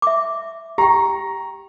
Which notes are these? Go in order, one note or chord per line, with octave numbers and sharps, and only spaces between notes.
E5 D6
G4 G5 A#5 C#6